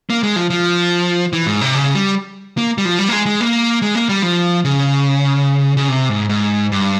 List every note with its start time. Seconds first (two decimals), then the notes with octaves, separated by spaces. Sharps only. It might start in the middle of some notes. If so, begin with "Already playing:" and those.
0.10 A#3
0.23 G#3
0.36 F3
0.50 F3
1.33 E3
1.46 G#2
1.61 C3
1.74 C#3
1.95 G3
2.58 A#3
2.78 G3
2.85 F3
2.99 G3
3.08 A#3
3.12 G#3
3.26 G#3
3.41 A#3
3.82 G#3
3.95 A#3
4.09 G3
4.22 F3
4.65 C#3
5.77 C#3
5.89 C3
6.09 G#2
6.29 G#2
6.72 G2